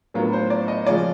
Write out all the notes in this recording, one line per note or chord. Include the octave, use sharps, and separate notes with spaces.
A2 F#3 B3 D4 F4 A#4
C5
D5
D#5
C#3 F3 G#3 C#4 F4 D5